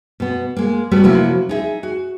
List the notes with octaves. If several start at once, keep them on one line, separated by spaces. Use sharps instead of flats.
B2 B3
G#3 A#3
G3 A3 B3 F#4 D5
C3 F3 F#3 A#3 E4 F#4
D#4 G#4 E5
F#4